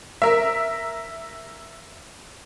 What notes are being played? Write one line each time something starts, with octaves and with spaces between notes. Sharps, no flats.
A#4 E5